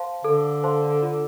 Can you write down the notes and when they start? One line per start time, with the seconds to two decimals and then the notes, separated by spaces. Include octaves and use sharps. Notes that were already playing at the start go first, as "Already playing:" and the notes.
Already playing: C5 F5 A5 C6
0.24 D3 A4
0.64 C5 F5 A5 C6
1.02 F4